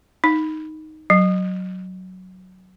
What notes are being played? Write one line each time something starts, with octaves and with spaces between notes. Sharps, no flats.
D#4
F#3